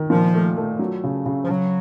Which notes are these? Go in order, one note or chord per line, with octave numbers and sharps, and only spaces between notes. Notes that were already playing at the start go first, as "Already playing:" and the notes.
Already playing: D#3
A#2 F3
A3
A3
F#3
C#3
C#3
F3
C#3 F#3